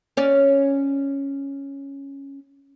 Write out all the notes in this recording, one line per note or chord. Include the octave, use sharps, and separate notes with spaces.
C#4 C#5 D5